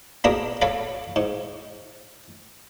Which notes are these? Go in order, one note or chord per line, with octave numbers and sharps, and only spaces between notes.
A#3 B3 D4 F#4 G#4 A#4
A4 C#5 F5 B5
G#2